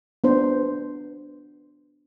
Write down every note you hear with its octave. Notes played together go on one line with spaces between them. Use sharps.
B3 D4 C5